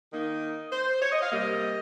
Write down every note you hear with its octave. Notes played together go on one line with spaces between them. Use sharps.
D#3 A#3 D#4 D#5
C5
C#5
D#5
F5
C3 G3 A#3 D#5